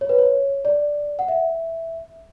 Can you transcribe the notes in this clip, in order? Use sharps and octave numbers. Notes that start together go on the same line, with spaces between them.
C#5
B4
C#5
D5
F#5
E5